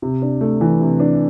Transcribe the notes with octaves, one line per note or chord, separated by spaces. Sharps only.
C3
D4
A3
E3
C3
D4